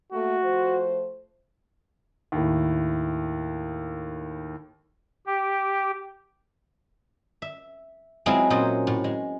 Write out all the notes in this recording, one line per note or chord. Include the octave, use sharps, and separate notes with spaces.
A3 A#3 F#4
F3 A3 C5
D#2 A2
G4
E5
F#3 G#3 C4 E4 F4 G#4
A#2 F#3 C#4 C5 D#5
A2
G#3